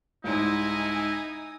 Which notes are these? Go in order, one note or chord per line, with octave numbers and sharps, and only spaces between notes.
C2 G#2 D#4 E4 G#5 D#6